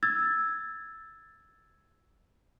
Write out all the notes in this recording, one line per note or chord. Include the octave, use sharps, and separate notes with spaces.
E6 G#6 A6